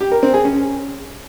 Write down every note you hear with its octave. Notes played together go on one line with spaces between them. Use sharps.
G4
A#4
C4
G#4
C#4